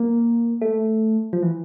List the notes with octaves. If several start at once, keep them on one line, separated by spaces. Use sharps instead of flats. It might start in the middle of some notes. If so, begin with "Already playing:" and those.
Already playing: A#3
A3
F3
E3